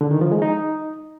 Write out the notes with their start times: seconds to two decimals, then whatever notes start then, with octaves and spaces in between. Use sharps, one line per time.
0.01 D3
0.11 D#3
0.21 F3
0.32 G#3
0.42 D#4